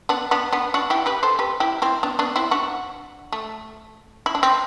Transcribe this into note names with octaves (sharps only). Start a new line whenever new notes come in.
B3 D4
B3 D4
B3 D4
D4 F#4
E4 G4
G4 B4
A4 C5
G4 B4
E4 G4
C4 E4
B3 D4
B3 D4
C4 E4
D4 F#4
A3
E4
D4
C4